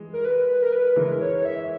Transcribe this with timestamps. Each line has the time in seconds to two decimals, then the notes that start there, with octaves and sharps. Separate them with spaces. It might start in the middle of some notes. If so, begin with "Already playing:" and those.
Already playing: E3 G#3
0.13 A#4
0.25 B4
0.48 B4
0.62 A#4
0.72 B4
0.96 E3 G#3 A#4
1.21 C#5
1.45 E5